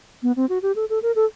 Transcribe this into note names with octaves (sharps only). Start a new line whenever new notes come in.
B3
C4
F#4
G4
A4
A4
A#4
A4